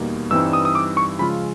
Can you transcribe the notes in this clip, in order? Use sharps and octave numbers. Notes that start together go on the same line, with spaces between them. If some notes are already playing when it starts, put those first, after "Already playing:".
Already playing: E2 B2 G3 A#3 D#4
G2 E3 G3 C4 D#4 E6
D#6
D#6
D6
C#6
C#3 F3 G#3 C#4 F4 B5